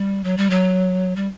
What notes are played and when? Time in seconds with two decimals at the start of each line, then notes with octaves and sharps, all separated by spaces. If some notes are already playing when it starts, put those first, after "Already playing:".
Already playing: G3
0.24 F#3
0.37 G3
0.50 F#3
1.16 G3